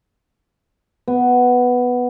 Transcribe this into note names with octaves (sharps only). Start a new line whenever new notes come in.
B3